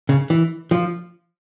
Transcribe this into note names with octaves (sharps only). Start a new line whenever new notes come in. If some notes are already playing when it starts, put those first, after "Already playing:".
C#3
E3
F3